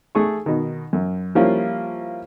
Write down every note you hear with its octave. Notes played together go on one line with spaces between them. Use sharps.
A3 G#4 C#6
B2 D#3
F#2
F3 G3 A#3 C#4 E4 F4